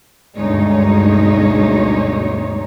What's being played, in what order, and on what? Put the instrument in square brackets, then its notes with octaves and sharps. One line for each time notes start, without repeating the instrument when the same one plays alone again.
[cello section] D2 G2 B2 G#3 D#4 C#5